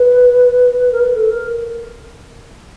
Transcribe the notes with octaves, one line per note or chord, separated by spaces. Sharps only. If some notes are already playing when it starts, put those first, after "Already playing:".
Already playing: B4
A#4
B4
A4
A#4